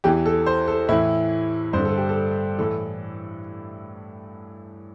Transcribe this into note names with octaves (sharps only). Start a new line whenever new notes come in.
E2 E3 G4
A4
C5
A4
A2 E3 E4
G2 D3 C5
A4
G4
A4
A2 E3 A4